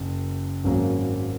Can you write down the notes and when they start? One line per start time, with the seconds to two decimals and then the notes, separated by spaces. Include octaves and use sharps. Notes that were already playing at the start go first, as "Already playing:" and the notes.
Already playing: F#1 F#2
0.64 G#1 F#2 C#3 F#3 A#3